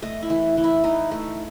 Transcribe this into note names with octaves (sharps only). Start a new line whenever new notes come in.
A3 D#5
E4
E3
E3
E4
E3 D#4
A3